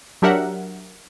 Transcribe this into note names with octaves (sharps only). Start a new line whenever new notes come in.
F#3 D4 G4 A#4 E5 F#5